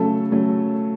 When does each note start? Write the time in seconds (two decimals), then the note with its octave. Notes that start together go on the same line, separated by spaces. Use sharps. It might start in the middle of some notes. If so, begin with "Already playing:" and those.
Already playing: C#3 F#3 A3 A4
0.31 C#3 F#3 A3